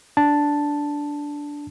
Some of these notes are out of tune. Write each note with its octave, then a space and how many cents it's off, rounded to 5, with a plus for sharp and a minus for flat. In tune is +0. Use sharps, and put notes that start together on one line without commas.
D4 -10 A5 +0